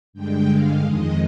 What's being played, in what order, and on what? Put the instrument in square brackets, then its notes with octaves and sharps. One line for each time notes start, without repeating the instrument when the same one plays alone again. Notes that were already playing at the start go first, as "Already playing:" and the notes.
[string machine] G2 D3 G#3 G5
F5
F2 D#3 G#3 D#5